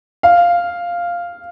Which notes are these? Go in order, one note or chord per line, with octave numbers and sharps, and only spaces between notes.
F5